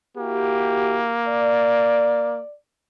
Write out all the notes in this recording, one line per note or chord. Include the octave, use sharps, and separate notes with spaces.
A#3 E4 F#4 G4
D5